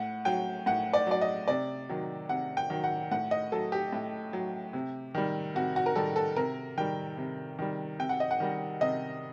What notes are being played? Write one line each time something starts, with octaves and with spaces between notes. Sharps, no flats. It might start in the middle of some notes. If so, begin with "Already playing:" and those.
Already playing: A2 F#5
F#3 G5
A2 F#5
D5
F#3 D5
D#5
C3 D5
D#3 F#3
C3 F#5
G5
D#3 F#3
F#5
A2 F#5
D#5
F#3 A4
G4
A2
F#3
C3
D#3 G3
C3 F#4
F#4
A#4
D#3 G3 A4
A4
C3 A#4
D#3 G3 G5
C3
D#3 G3
C3 G5
F#5
D#5
F#5
D#3 G3
C3 D#5